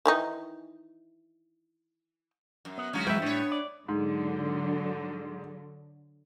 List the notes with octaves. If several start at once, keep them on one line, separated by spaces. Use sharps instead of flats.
D#3 E3 D#4
F#2
B3
D2 F#3 G#3 C#4 F4 F#4
E2 F#3 G#3 B4 E5 G5
A2 G3 B3 D4 C#5
D5
G#2 D3 F#3